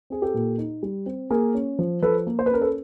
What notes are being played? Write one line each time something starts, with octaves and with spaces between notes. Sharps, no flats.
C4 G#4
G4 A4
A#2
D#4
G3
C4
A#3 G#4 A#4
C#4
F3
F3 A4 B4
A#3
C5
B4
C#4 A#4
A4 B4